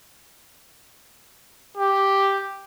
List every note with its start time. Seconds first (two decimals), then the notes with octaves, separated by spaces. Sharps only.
1.77 G4